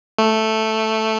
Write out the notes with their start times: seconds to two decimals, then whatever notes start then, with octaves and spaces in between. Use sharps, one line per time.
0.18 A3